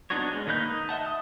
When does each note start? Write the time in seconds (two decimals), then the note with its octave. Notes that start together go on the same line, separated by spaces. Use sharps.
0.10 B3 D4 D#4 F#4 C#5
0.32 G#3 C#4
0.47 D#3 A#3 D#4 B4 G6
0.64 D#4
0.89 D#5 E5 F#5 A5
1.06 D#6